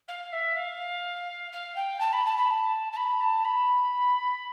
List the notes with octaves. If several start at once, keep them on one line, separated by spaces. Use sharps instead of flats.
F5
E5
F5
F5
G5
A5
B5
A5
B5
A5
A5
B5
A5
B5